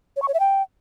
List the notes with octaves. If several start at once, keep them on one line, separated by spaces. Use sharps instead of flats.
C#5
C#6
C#5
E5
G5